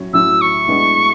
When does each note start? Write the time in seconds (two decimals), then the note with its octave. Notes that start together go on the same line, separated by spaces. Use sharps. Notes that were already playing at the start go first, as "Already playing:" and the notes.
Already playing: A2 F#3 C#4
0.13 A2 F#3 C#4 E6
0.41 C#6
0.68 A2 G#3 B3 D4